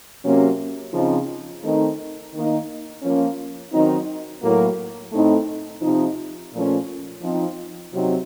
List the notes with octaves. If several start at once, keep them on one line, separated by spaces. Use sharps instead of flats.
C3 F#3 A#3 C#4
C#3 F3 C4 D#4
D#3 A3 C4 D#4
D#3 A#3 D#4
F3 A#3 C#4
D#3 F#3 C4 D#4
A2 F#3 A#3
A2 A3 C4 D#4
C3 F3 C4 D#4
A#2 F3 A3 C#4
F3 C4 D#4
C3 F#3 C4 D#4